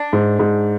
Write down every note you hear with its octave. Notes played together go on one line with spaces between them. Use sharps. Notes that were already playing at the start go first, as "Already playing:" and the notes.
Already playing: D4
G#2
G#2